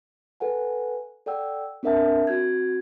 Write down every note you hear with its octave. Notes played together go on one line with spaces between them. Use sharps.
A4 B4 F#5 G#5
A4 D5 F#5 G5 E6
C4 D4 A#4 E5 F#5 A5
C4 F#4 G6 G#6